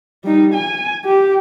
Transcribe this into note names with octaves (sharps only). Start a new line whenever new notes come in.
G3 D#4
G#5
G4